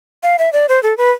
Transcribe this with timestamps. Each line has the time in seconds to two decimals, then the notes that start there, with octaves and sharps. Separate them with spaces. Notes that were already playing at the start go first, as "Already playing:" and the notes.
0.23 F5
0.39 E5
0.53 D5
0.69 C5
0.83 A4
0.97 B4